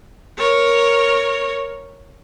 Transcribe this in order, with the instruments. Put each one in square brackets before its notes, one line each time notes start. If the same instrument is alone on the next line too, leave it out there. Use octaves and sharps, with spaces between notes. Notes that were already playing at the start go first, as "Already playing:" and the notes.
[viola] A#4 C#5